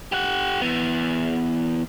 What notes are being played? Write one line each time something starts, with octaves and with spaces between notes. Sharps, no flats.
G4 F#5
E3 B3